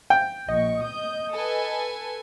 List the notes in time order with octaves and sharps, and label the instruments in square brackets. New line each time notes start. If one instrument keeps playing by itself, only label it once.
[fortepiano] G5
[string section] A#1 C#6 [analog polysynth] D#5
[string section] D#6 G6
A4 B4 G#5